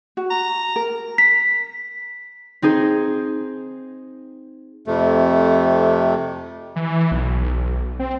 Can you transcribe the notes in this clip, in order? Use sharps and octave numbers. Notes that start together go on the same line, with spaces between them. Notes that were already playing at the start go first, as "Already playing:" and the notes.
F#4
A#5
A#4
B6
C4 D#4 G#4 C5
F2 C3 A3
E3
B1
C4